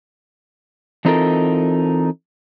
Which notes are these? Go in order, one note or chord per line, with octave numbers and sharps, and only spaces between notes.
E3 C4 D#4 F4 A4 A#4